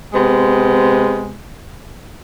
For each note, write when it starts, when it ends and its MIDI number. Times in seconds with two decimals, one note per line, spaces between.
0.14 1.39 48
0.14 1.39 56
0.14 1.39 59